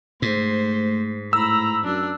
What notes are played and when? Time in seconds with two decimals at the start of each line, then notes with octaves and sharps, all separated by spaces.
0.22 G#2 A3 C5
1.33 A2 A#5 B5 E6
1.84 F#2 D4